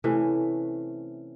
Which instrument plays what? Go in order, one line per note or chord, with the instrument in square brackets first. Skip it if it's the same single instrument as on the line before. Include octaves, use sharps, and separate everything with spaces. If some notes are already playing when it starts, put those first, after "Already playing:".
[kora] C3 E3 A3 C#4